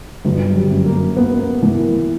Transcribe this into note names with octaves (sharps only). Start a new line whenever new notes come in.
G1 F#3
F#3
G3
F#2
A#3
A#3 B3
E3